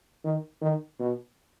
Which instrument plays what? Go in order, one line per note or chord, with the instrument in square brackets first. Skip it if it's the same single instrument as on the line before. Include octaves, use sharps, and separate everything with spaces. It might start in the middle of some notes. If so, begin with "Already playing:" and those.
[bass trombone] D#3
D#3
B2